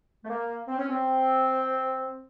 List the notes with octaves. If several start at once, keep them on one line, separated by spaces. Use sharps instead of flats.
A3
A#3
C4
C#4
C4